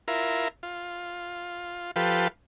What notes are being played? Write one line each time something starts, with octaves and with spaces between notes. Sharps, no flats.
E4 F4 A#4
F4
F3 F4 G4 A4 B4